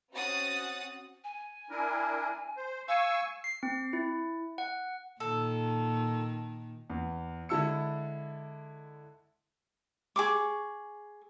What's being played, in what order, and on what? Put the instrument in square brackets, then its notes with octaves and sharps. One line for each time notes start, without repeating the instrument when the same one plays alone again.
[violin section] C4 C#4 F#4 F#5 D#6 A6
[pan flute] G#5
[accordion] D4 E4 A#4
C5
[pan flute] F5 [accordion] G#5 C#6 E6
[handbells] C7
C4
E4
F#5
[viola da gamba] A#2 D#3 [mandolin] A4
[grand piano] E2
D3 G#3 E4 A5 E6 C#7
[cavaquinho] G#4 C#6 D6